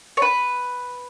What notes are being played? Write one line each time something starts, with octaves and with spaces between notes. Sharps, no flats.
C#5
B4